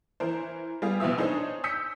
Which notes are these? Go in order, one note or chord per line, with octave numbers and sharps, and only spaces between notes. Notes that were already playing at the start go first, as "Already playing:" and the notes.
E3 A#4 C5
G3 B3 G#4 F5
A#1 E2 B2 E5 E6
D4 D#4 G#4 C5 C#5
D#6 E6 G6 B6 C#7